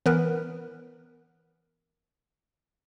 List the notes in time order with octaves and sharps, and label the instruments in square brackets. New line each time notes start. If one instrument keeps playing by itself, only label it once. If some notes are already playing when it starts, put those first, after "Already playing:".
[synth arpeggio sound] E3 B3 A#4 B4